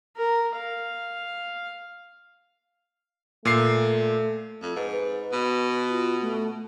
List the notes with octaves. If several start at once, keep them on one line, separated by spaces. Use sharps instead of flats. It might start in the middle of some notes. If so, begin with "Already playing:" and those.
A#4
F5
A#2 A3 C7
F2 F4
G#2 B4
B4
B2
F4
A3